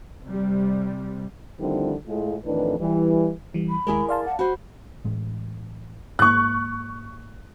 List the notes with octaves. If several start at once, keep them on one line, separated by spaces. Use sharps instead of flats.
C3 G3
D3 D#3 F3 G3 C4 E4
A2 G#3 F4
F2 A2 D#3 E3 D4 B4
E3 G3
E3 G3
B5
D#2 G#3 E4 G#4 A#4
D5 F5 A5 C6
F#5
F#4 C5 B5
A1 A2 G#3
G#2 G#3 A#3 C#6 F#6